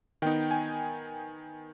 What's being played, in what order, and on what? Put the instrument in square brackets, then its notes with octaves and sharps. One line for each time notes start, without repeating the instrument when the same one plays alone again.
[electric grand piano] D#3 B3 D#4 G5
G#5